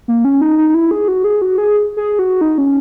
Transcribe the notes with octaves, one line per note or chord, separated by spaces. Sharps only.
A#3
C#4
D#4
D#4
D#4
E4
G#4
F#4
G#4
F#4
G#4
G#4
F#4
D#4
C#4